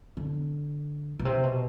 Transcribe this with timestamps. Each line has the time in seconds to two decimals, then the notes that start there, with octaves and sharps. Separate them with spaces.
0.17 D3
1.19 B2
1.25 C3
1.44 B2